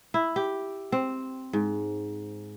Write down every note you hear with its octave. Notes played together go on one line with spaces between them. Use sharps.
E4
G4
C4
G#2